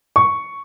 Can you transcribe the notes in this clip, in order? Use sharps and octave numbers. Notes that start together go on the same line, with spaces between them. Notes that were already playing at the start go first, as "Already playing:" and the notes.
C#6